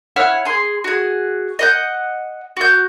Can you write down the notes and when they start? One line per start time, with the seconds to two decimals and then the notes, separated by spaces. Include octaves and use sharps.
0.16 E4 C#5 F#5 F6
0.45 G#4 C6
0.84 F#4 G#4
1.59 D#5 F#5 G6
2.57 F#4 G6